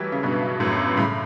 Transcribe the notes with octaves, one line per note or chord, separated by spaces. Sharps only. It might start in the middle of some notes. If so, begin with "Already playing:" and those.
Already playing: E3 F#3 G3 A3
C#3
G2 B2
F#2 A2
A2 C#3